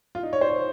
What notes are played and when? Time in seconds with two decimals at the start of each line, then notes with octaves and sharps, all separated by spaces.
0.15 F4
0.23 D#4
0.33 C#5
0.41 C5
0.49 C#5